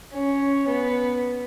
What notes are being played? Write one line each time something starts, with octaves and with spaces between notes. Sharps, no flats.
C#4
B3